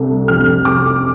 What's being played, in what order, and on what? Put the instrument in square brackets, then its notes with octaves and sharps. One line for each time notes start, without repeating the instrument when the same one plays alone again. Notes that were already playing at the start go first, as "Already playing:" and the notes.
Already playing: [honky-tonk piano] C2 C3 A3 D4
F1 F2 C3 F6
D6